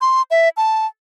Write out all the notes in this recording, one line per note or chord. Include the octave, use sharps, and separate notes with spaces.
C6
E5
A5